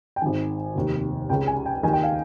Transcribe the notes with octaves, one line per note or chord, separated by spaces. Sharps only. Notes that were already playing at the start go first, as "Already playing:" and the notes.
G5
G#1 G#2 D#3 G#5
F1 D#2 D#3
C#2 C#3 G5
G#5
G5
D#2 D#3 G#5
G5
F5